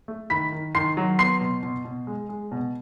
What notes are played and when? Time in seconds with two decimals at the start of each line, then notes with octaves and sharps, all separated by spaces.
0.08 A3
0.30 D#3 B5 B6
0.52 D#3
0.75 D#3 C6 C7
0.97 F#3
1.19 B3 C6 C7
1.41 B2
1.63 B2
1.85 B2
2.07 G#3
2.29 G#3
2.52 B2